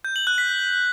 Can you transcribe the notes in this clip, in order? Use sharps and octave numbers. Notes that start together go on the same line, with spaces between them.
G6
F#7
F#6
B6